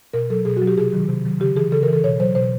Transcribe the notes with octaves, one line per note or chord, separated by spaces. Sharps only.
B2 A#4
F#3 A4
B2 G#4
F#4
F#3
G4
C3 G#4
D#3 F#3
C3
D#3 F#3
C#3 G4
E3 G#4
C#3 A4
A#4
E3 A4
B2 C#5
F#3 C5
B2 C5